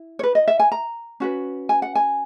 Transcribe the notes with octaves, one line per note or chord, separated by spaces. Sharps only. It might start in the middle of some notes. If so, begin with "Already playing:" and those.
Already playing: E4
C#5
B4
D#5
E5
G#5
A#5
C#4 F#4 B4
G#5
F#5
G#5